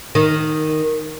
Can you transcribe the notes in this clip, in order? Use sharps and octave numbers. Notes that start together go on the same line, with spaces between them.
D#3